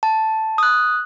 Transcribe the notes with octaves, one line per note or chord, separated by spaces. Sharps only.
A5
D#6 F#6